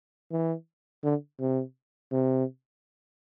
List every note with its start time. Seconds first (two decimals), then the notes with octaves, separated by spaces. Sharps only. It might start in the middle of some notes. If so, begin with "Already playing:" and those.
0.32 E3
1.04 D3
1.40 C3
2.12 C3